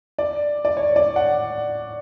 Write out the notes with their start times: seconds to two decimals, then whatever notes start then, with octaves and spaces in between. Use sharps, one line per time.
0.18 D5
0.65 D5
0.77 C#5
0.96 D5
1.16 F#5